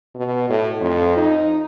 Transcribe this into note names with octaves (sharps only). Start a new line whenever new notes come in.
B2
A2
F2
D#4